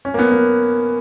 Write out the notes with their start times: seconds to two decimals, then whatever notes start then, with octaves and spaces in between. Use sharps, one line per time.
0.05 C#4
0.14 A#3
0.19 B3
0.31 A#3